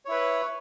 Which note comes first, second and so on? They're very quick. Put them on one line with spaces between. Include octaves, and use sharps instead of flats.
C#5 E4 B4